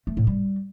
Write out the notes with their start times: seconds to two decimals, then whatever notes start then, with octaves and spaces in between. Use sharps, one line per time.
0.07 A3
0.17 A2
0.27 G3